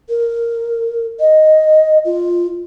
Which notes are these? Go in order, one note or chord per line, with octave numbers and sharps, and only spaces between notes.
A#4
D#5
F4